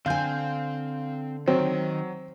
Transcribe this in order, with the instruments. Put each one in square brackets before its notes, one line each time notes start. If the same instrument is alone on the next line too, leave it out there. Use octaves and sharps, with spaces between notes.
[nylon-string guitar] D3 G#5 [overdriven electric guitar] C4 G5 [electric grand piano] F5 G6
[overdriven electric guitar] D#3 [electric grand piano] F#3 [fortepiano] C4